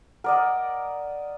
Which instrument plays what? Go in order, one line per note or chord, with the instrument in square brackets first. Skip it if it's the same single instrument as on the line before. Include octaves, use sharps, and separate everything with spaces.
[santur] A#4 D5 D#5 [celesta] F#5